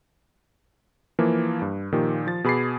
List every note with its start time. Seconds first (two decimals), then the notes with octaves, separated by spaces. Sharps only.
1.19 E3 F3 A#3
1.62 G2
1.92 A#2 D#3 F3 G4
2.27 F3 A6
2.44 B2 G#4 B5 D6 C7